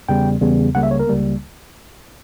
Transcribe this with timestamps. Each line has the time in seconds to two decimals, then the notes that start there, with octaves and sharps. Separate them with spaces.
0.09 E2 C#3 G3 B3 G5
0.41 E2 C#3 G3 B3
0.75 C#2 C#3 G3 A#3 F#5
0.83 E5
0.91 C#5
0.99 A#4
1.07 C#2 C#3 G3 A#3